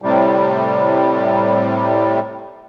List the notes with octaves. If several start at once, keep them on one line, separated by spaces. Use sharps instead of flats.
A2 C3 G3